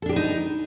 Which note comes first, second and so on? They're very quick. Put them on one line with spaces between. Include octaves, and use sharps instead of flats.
A4 D4 G4 B4 D#4